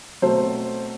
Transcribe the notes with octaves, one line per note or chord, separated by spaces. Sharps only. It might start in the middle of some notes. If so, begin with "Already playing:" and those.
B2 F#3 A3 C4 C5